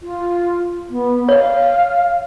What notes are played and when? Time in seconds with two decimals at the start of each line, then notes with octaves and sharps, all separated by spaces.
0.01 F4
0.90 B3
1.29 C#5 F5